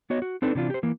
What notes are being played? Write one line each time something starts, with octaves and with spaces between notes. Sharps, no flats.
B3 F#4 C#5 D#5
F#4
C4 D4 D#4 A4 B4
C3 E3 D4 F4
G4 C5
E3 A#3